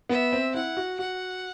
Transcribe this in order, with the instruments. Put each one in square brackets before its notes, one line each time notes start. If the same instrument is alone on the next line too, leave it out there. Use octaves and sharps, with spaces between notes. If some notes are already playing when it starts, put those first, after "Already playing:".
[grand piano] B3 [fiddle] E5
[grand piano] C4
[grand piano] E4 [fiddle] F#5
[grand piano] F#4
[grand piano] F#4 [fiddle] F#5